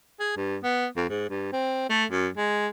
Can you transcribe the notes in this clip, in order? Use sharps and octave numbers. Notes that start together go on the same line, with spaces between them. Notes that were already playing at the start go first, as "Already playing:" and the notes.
G#4
G2
B3
F2
G#2
G2
C4
A3
F#2
G#3